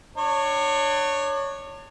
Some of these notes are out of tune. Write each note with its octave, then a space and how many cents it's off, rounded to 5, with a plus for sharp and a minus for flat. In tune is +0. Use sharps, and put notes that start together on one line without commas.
D4 +35 C#5 +0